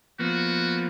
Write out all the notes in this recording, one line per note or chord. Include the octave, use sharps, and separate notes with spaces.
F3 A#3 B3 F#4